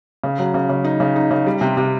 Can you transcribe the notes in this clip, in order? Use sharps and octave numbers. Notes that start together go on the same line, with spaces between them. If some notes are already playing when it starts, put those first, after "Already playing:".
C#3
F#3
C#3
C#3
D#4
C#3
D#4
C#3
G3
C3
C3